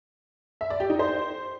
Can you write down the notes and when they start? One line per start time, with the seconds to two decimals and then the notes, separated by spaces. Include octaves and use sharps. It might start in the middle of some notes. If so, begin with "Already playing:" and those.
0.61 E5
0.70 D5
0.80 G4
0.90 D#4
0.99 C5